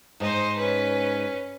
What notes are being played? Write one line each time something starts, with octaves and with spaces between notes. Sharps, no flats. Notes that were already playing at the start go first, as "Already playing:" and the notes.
G#2 D#4 C5
C#4 B4